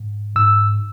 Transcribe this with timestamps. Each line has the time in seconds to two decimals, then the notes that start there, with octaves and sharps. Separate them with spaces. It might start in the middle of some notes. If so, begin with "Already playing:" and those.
Already playing: G#2
0.35 G#2 E6